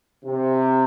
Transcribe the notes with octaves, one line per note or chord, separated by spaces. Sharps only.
C3